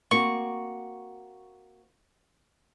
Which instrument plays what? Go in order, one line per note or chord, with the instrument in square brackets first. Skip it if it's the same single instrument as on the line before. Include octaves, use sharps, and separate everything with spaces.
[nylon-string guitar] A#3 C4 F#4 [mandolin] C#6